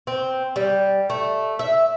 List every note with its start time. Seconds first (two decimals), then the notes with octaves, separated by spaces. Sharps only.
0.07 C4
0.56 G3
1.10 A3
1.59 E5